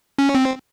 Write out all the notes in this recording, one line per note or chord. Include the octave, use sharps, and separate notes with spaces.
C#4
C4